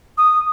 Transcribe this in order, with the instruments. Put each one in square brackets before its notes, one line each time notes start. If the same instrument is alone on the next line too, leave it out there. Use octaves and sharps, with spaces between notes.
[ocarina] D#6